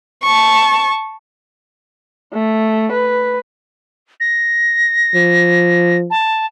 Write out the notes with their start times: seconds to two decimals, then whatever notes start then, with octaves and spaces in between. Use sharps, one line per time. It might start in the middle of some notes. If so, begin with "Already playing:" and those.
0.23 A5 C#6
2.34 A3
2.93 B4
4.20 A#6
5.15 F3
6.10 A5